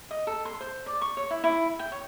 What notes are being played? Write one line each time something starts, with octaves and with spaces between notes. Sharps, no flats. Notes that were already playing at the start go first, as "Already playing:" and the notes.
D#5
A4
C6
C5
D5
C#6
C#5
E4
E4
G5
C#5